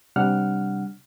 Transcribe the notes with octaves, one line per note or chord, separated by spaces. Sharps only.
C3 G3 D4 F#5 F6